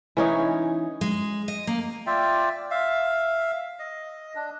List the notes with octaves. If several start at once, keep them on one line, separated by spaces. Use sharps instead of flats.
E3 C#4 D#4
G#3
D#5
A#3
F4 D5 E5 G5
E5 F5
D#5
D4